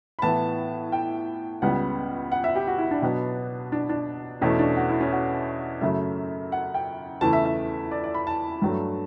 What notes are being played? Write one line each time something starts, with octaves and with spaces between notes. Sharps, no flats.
B5
A2 E3 B3 A5
G5
C#2 C#3 G3 B3 F#5
F#5
E5
G4
F#4
E4
D4
B2 F#3 B3
D4
D4
E2 B2 A3 C#4
D4
F#4
E4
C#4
F#4
F#2 C#3 F#3 A3 E5
F#5
G5
E2 C#3 E3 A3 A5
E5
E5
D5
D5
B5
A5
G2 F#3 A3